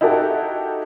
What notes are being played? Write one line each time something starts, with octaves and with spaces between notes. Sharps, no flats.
D#4 E4 F#4 G4 A4